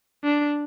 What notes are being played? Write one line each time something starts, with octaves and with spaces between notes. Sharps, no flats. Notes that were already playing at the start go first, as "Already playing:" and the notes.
D4